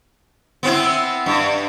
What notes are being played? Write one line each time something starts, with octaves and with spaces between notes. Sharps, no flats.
B3 C4 E4
G2